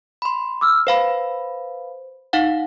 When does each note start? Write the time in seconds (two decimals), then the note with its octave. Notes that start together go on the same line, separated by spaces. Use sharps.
0.22 B5 C6
0.61 D6 E6 F6
0.87 B4 C5 F5 B5
2.33 D#4 F5 F#5